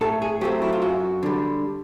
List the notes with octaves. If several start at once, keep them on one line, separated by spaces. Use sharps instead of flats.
A2 A4
G#4
F#3 A3 C4 G4
E4
F4
F#2 F#4
D3 G3